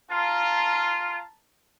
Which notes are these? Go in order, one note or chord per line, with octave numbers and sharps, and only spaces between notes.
F4 A5 A#5